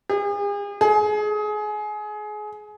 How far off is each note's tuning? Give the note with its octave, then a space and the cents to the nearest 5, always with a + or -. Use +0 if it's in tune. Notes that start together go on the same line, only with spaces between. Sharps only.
G#4 -40
G#4 +25